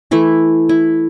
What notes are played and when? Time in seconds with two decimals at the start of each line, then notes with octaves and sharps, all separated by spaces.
0.11 E3 A3 E4
0.69 E4